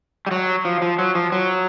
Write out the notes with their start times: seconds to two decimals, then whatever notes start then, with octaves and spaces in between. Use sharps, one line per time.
0.27 G3
0.31 F#3
0.65 F3
0.82 F3
0.99 F#3
1.15 F3
1.32 F#3